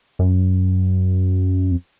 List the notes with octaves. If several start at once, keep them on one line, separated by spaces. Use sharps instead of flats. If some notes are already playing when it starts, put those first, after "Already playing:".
F#2
F2